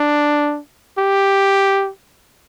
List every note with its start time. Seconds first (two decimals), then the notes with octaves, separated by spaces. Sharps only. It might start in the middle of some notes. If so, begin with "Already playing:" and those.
Already playing: D4
0.99 G4